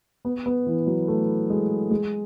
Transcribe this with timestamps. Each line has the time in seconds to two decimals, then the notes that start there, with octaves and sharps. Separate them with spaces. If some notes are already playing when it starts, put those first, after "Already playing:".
0.25 B3
0.46 B3
0.67 E3
0.87 F#3
1.08 A3
1.50 G#3
1.91 G#3